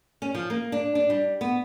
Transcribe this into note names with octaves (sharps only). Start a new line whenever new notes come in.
C#4
F3
A#3
D4
D4
G3
B3